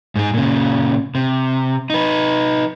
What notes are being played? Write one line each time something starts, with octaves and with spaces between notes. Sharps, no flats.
G#2 G#4
A#2 C#3
C3
D#4 B4